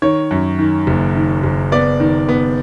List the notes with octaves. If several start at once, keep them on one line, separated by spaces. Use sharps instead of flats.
D#3 C#5
F#2
D#3
F#1
D#3
F#1
B3 D5
D#3
B3